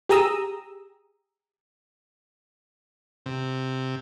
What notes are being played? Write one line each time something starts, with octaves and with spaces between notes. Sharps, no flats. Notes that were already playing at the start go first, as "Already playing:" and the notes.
G4 G#4 A#5 D#6 E6
C3